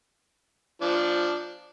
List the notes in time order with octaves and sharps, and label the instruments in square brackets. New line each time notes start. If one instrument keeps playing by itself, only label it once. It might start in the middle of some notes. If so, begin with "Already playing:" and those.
[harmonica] F3 D4